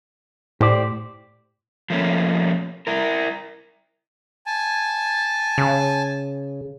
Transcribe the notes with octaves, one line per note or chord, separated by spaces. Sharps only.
A2 G4 C5 D5
F3 A3 A#3 C#4
E4 A#4
G#5 A5
C#3